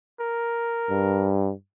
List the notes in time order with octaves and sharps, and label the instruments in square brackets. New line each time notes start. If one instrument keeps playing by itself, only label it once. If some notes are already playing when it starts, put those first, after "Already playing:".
[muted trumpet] A#4
[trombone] G2